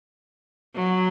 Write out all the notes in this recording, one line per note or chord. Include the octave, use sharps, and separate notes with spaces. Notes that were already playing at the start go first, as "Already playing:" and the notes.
F#3